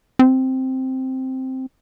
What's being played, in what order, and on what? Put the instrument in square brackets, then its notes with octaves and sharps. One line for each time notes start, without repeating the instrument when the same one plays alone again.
[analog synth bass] C4